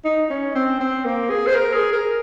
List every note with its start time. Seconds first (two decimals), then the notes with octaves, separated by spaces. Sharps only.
0.05 D#4
0.30 C#4
0.55 C4
0.80 C4
1.05 A#3
1.30 G#4
1.47 C5
1.55 A#4
1.74 G#4
1.93 A#4